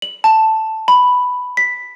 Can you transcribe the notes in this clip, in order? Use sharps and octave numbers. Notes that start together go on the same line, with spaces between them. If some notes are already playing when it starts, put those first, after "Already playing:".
F#7
A5
B5
B6